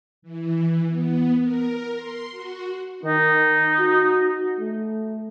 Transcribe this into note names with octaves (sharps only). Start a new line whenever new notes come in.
E3
B3
A#4
C6
F#4
D#3 D#4
F#4
A3